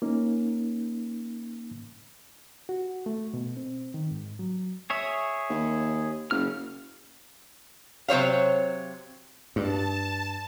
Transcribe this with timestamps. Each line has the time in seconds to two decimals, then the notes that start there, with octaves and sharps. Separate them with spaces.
0.02 A#3 C#4 D#4
2.69 F#4
3.06 A3
3.34 B2
3.57 C4
3.94 D#3
4.11 G#2
4.39 F#3
4.90 G#4 C#5 E5
5.50 D#2
6.31 F#1 C#3 F6
8.08 C3 F#3 C5 C#5 F5
9.56 G2 A5